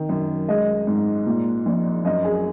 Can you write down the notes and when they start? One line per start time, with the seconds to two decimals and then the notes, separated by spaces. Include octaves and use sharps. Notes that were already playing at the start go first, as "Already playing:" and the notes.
Already playing: D#3
0.09 F#2
0.48 G#3 D#5
0.87 G#2
1.27 A#2
1.66 A#1
2.05 F#2 D#5
2.24 G#4